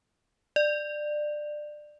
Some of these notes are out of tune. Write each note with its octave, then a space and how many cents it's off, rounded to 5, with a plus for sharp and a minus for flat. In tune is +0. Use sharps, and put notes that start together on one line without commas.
D5 +20